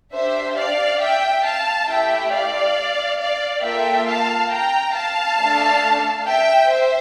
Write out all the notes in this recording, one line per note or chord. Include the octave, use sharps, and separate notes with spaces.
D4 G4 C5 E5
D5 F5
E5 G5
F5 A5
A3 E4 G4 E5 G5
D5 F5
D5 F5
A#3 F4 A4 E5 G5
F5 A5
G5 A#5
F5 A5
A3 D4 A4
E5 G5
C5 E5